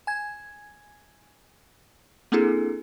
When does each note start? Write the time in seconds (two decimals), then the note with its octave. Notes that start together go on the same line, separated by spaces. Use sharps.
0.07 G#5 G#6
2.32 A#3 C4 D4 E4 G#4 A4